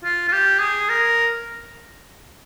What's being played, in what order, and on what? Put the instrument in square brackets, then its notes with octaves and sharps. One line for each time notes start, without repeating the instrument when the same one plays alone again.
[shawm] F4
F4
G4
G#4
A#4